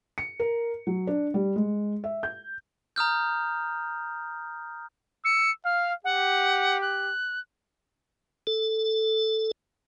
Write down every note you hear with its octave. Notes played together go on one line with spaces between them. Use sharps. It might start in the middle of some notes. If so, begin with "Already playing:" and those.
C#7
A#4
F#3
D4
G3
G#3
E5
G6
A#5 D#6 F6 G6
E6 C#7
F5 F6
G4 F#5
F#6
A4